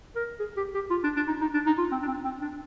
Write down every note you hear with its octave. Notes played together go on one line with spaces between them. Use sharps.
A#4
G#4
G4
G4
F4
D4
D4
D#4
D#4
D4
D#4
F4
C4
D4
C4
C4
D4